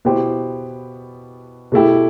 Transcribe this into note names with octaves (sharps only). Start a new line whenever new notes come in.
B2 B3 E4 G4 C5
B2 A3 E4 G4